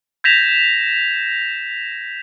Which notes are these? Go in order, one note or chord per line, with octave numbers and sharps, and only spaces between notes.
G6 G#6 A#6 B6 E7 F7